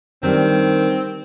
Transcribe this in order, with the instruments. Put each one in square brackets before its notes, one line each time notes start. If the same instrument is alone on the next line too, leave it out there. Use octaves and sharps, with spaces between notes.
[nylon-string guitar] D#3 G3 D4 [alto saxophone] C4